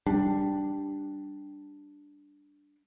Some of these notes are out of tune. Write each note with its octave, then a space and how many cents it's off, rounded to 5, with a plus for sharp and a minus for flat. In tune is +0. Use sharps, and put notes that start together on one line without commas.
G3 +0 D4 +0